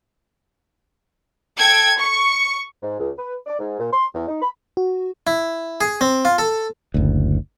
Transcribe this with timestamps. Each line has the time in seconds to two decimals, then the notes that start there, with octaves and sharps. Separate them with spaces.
1.57 A4 G5 G#6
1.99 C#6
2.83 G#2
3.00 C#2
3.17 B4
3.47 D5
3.59 G#2
3.79 A#2
3.92 C6
4.14 E2
4.28 D#4
4.42 B5
4.77 F#4
5.27 E4
5.81 G#4
6.01 C4
6.25 F4
6.38 A4
6.94 F#1 D2